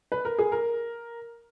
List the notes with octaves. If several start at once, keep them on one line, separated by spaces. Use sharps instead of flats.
B4
A#4
G#4
A#4